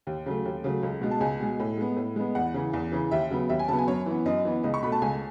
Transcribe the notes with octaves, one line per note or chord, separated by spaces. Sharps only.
D#2
C#3 F#3 A3
D#2
C#3 F#3 A3
C#2
B2 G#3
A5
C#2 G#5
B2 G#3
A2
G#3 B3
A2
G#3 B3
E2 F#5
C#3 E3
E2
C#3 E3
D#2 E5
C#3 F#3 B3
D#2 E5
G#5
C#3 F#3 B3 A5
G#5
F#2 C#5
E3 B3
F#2 D#5
E3 B3
C#2 D#5
C#6
B2 A3 B5
A5
C#2 G#5